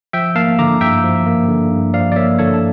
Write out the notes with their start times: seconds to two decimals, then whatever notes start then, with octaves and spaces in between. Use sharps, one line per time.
0.13 F3 E5 G5
0.35 A#3 F5 A5
0.59 D3 A#5 D6
0.81 G2 E5 G5
1.04 F3
1.26 A#3
1.48 D3
1.71 G2
1.94 F3 D5 F5
2.12 D5
2.16 A#3 C#5 E5
2.39 D3 A4 C#5
2.54 A5